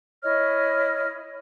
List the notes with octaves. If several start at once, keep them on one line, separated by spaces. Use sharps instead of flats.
E4 C#5 D#5 F6